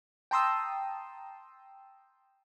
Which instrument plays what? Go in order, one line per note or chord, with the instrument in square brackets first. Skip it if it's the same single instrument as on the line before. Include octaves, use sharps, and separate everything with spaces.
[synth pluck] G5 A5 A#5 C6 D#6 E6